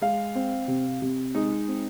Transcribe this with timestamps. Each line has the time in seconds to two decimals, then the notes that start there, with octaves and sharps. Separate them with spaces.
0.02 G#3 F5
0.35 C4
0.68 C3
1.02 C3
1.35 G#3 D#4
1.68 C4